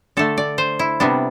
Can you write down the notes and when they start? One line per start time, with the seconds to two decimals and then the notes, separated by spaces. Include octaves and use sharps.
0.17 D3 A3 A4
0.38 D5
0.58 C5
0.79 E4
1.00 C3 G3 B3 D4